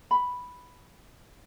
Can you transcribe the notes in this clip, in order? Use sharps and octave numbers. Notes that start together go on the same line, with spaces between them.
B5